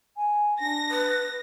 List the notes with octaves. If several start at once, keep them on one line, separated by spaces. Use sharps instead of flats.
G#5
D4 A#6
B4